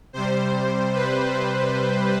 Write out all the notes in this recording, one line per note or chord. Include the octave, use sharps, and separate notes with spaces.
C3 G3 C5
B4